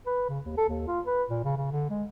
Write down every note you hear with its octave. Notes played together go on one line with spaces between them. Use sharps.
B4
C#3
D#2
A4
D#2
F4
B4
A#2
C#3
C#3
D3
G#3